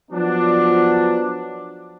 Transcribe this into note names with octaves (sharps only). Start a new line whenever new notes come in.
F3 F#3 B3 D4